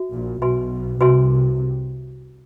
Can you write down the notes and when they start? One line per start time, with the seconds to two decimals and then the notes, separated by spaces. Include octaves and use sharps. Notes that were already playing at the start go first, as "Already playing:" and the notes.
Already playing: F#4 E5
0.13 A#1 A#2
0.42 B1 B2 F#4 B4 E5 G#5 C6
1.01 C2 C3 F#4 B4 E5 G#5 C6